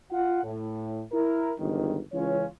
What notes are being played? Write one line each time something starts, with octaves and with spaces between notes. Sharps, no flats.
F4 F#5
A2
E4 A#4
G1 C#2 D#3
C#2 E3 C#4 F4 C#5